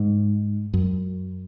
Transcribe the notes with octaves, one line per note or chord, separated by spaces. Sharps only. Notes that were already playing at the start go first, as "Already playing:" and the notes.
Already playing: G#2
F#2